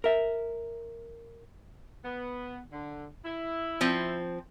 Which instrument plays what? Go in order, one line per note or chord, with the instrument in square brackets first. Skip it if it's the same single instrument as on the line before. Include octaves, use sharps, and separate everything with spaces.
[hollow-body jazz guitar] A#4 E5
[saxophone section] B3
D3
E4
[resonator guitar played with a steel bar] F3 C4